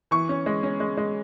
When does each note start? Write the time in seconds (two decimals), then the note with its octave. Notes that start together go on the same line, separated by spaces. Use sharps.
0.11 E3 C#6
0.29 C#4
0.46 G#3
0.63 C#4
0.80 G#3
0.97 G#3